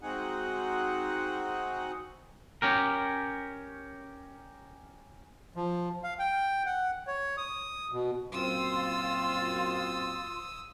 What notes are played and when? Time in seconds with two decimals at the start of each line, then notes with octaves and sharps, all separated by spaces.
0.01 G#3 C4 D#4 F#4 G#4 F#5
2.62 C#4 G4 A#4
5.56 F3
6.03 F5
6.19 G5
6.66 F#5
7.07 C#5
7.37 D#6
7.92 B2
8.32 F#2 A#2 C4 F4 C6 D#6 E6